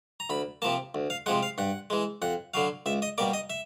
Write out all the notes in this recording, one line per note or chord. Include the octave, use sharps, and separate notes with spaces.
A#5
D2 B5
C3 F3 A#3 A5
D2
F5
C3 F3 G#3 F#5
F5
G2 F#5
E3 G#3
F2 F#5
D3 F#3 F5
C#2 E5
D#5
B2 G3 A#3 D5
D#5
E5